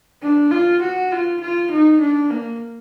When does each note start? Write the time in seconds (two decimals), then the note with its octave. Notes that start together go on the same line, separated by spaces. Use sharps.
0.23 D4
0.52 F4
0.82 F#4
1.12 F4
1.41 F4
1.71 D#4
2.01 D4
2.31 A#3